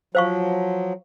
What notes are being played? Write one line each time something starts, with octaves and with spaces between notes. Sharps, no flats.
F3 F#3 C5 F5 C#6